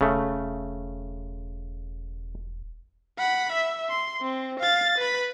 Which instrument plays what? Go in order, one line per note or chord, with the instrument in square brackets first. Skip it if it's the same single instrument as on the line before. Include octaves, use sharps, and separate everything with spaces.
[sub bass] E1 [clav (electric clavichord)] C#3 A3
[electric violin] F#5 B5
E5
C6
C4
F5 A6
B4 B5